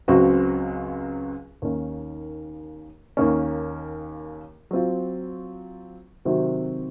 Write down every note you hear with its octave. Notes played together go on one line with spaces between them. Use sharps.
C#2 C#3 F#3 C4 F#4
D#2 D#3 A#3 C#4
D#2 D#3 A#3 C#4
F#3 C4 F4
C3 D#3 F#3 C4 F#4